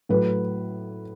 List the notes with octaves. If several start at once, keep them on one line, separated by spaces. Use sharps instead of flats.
A2 F#3 B4